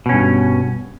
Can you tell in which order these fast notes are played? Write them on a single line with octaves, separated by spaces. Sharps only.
B2 C#4 G2